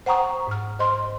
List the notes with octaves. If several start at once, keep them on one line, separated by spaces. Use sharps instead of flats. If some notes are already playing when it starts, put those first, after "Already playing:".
C5 F#5 G5 A#5 C#6 D#6
G#2 F6
C5 D#5 C6